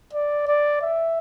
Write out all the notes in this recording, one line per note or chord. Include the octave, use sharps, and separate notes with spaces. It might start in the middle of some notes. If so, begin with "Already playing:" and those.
D5
D5
E5